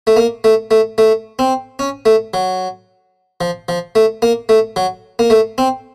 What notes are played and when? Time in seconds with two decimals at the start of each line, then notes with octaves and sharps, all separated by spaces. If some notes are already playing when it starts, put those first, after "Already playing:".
0.07 A3
0.17 A#3
0.44 A3
0.71 A3
0.98 A3
1.39 C4
1.79 C#4
2.06 A3
2.34 F#3
3.41 F3
3.69 F3
3.95 A3
4.22 A#3
4.49 A3
4.76 F#3
5.19 A#3
5.30 A3
5.58 C4